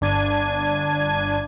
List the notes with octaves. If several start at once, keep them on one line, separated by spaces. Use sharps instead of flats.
G1 D4 G#6 D#7